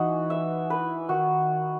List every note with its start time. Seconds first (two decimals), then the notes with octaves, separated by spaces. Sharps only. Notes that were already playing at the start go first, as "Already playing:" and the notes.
Already playing: E3 D#4 F#4
0.30 E5
0.70 B4
1.09 D#3 F#4